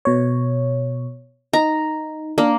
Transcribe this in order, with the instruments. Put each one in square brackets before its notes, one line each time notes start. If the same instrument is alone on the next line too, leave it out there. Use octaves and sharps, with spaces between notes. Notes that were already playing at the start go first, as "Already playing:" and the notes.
[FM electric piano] B2 C#5
[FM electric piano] D#4 [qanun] A#5
[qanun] A#3 [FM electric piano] D4